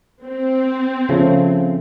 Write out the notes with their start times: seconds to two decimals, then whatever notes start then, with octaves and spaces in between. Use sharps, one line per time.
0.24 C4
1.09 C#3 F3 A3